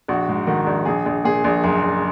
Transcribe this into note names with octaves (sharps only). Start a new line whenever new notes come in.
A#1 F#4
G#2
D#3 F#4
A#1
A#1 G#4
A#1
A#2 G#4
A#1
F#1 G#4
F#1